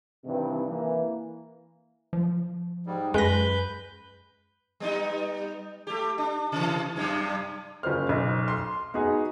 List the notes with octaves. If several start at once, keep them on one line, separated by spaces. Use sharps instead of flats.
G2 C3 D#3 E3
E3 A#3
F3
G#2 G3
F#2 G#3 B4 G6 A#6
G3 B3 D#4
A3 G4
D4
C3 E3
F#2 C3 G3
F#1 F4 C5 F6
B1
C6
B3 D#4 F#4 G#4